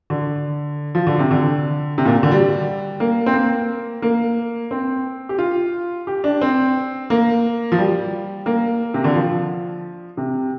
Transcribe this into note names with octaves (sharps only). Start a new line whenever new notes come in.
D3
F3
D3
C3
D3
C3
A#2
D3
G3
A#3
C4
A#3
A#3
C4
G4
F4
G4
D4
C4
A#3
F3
G3
A#3
C3
D3
F3
C3